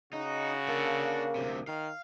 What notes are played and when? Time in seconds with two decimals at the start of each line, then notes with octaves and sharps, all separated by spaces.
0.13 C#3 D#4 F#4
0.68 A#3 D4 A4
1.35 D2 C3
1.67 D#3 F5